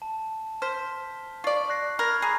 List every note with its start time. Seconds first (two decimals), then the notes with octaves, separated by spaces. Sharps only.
0.02 A5
0.62 C5 F6 B6
1.44 F4 D5 C#6
1.70 F#6 A#6 C7
1.99 A#4 B5 G#6 A#6
2.22 G#4 A#5 B5